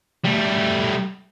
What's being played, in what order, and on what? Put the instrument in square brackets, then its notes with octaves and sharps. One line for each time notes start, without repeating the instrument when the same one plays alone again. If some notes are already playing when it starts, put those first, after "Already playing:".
[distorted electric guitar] G3 A3